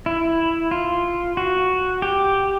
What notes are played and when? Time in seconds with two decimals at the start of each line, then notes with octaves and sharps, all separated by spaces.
0.06 E4
0.71 F4
1.37 F#4
2.02 G4